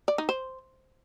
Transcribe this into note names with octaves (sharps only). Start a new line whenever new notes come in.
D5
D#4
C5